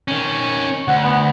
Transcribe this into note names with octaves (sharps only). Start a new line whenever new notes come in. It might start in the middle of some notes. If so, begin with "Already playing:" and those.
D#3 C#4
D2 F#5
B3